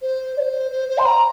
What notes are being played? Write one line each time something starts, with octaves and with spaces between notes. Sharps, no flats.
C5
D5
C5
C5
C5
C6
A#5